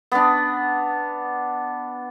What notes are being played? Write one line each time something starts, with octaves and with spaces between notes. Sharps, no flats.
B3 D4